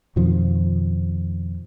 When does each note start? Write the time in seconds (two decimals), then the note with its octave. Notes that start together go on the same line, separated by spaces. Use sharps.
0.16 F2 B2 D#3 F3